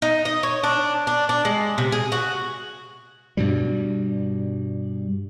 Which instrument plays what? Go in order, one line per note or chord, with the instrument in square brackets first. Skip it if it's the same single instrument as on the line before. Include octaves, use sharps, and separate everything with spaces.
[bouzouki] D#4
D#5
C#5
D4
D4
D4
G#3
C3
G#4
F#4
[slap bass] G2 B2 G3